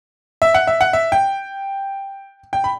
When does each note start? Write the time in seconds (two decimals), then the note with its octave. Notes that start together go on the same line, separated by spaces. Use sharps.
0.42 E5
0.54 F#5
0.67 E5
0.81 F#5
0.93 E5
1.12 G5
2.53 G5
2.64 B5